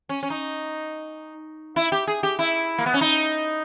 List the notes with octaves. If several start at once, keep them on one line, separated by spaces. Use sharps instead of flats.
C#4
C#4
D#4
E4
G4
G#4
G4
E4
A#3
B3
C#4
D#4